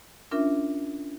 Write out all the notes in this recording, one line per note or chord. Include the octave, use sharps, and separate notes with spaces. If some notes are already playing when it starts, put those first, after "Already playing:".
C#4 D4 F4 A#4 E5